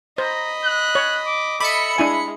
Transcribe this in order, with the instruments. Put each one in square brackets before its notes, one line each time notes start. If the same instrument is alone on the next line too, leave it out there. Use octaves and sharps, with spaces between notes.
[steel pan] C5 [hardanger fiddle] D#5 B5 [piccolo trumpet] A#5
[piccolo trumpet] F#6
[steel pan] C#5
[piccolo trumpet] D6
[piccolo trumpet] A4 [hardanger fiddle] D#5 E5 [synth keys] B5 C#7 [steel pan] D6
[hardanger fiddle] G#3 [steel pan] D4 E4 G#5